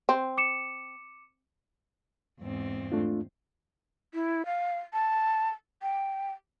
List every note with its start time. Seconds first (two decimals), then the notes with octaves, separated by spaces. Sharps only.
0.09 C4
0.38 D6 C#7 E7
2.41 E2 G#2 C4
2.92 A3 D4 F4
4.14 E4
4.46 F5
4.93 A5
5.82 G5